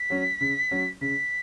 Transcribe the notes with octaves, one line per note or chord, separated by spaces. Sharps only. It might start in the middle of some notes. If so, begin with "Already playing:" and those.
Already playing: B6
F#3 C#4
C#3
F#3 C#4
C#3 B6